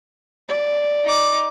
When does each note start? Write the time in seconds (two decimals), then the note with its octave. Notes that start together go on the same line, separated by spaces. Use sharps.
0.49 D5
1.04 D#4 D6